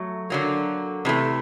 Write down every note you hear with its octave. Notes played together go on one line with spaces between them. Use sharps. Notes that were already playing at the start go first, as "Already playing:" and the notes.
Already playing: F#3 A3
D3 F#3 A#3
C3 E3 A3